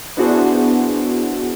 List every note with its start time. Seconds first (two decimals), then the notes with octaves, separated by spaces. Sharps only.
0.17 B3 D4 E4 F#4 G#4 C5